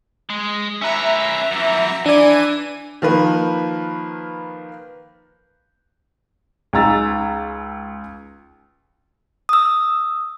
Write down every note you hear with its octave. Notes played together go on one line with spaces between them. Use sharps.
G#3
C#4 B4 E5 A#5
F#2 E3
E3 D4 D5 G#5 D#7
D#3 F3 A#3 B4
C#2 D#4 G#4 A#5 E6 A6
D#6 E6